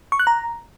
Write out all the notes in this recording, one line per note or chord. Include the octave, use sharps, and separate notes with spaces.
C#6
F#6
A#5